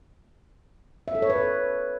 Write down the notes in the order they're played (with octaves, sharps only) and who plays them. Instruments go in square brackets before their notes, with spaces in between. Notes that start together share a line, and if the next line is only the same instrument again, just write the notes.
[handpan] E5
A4
C#5
B4